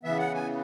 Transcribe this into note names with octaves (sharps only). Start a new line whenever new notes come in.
C#3 E3 B3 E5
F#5
G#5